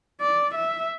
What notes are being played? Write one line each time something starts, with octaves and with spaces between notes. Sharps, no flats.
D5
E5